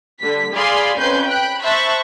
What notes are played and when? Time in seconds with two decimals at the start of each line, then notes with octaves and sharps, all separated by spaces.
0.21 D3 G3 B6
0.55 G#4 D5 F5 G#5 B5 C6
0.99 F2 C#4 B4 C6 G6
1.28 G5 B5 F#6
1.62 C5 E5 A5 B5 C#6 F#6